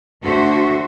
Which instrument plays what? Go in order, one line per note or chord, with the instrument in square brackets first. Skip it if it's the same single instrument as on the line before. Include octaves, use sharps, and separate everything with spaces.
[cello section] D2 D3 A3 F#4 C5 E5